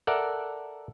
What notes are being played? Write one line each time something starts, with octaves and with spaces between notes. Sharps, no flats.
A4 A#4 D5 E5 F#5